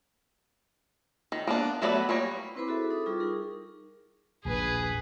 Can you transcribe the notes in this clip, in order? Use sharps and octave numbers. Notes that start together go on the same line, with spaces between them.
D#3
A#3 B3 D4
F#3 A3 B3 D5 B5
G3 A#3 C#5
C4 E4 B4 C5 B5 D6
E4 F#4 G#4 A4 E5
D#4 A4 D6 D#6
G3 F4 G#4 C#6 D6
D#4 G#4 A#4
D#1 A#1 G#4 B4